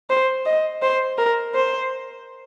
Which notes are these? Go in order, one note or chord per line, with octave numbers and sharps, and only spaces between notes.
C5
D#5
C5
A#4
C5